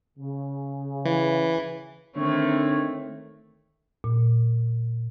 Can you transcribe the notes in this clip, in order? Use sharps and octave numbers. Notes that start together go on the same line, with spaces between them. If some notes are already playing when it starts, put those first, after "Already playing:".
C#3
E3
D3 D#3 A3 C4 D#4 C#5
A#2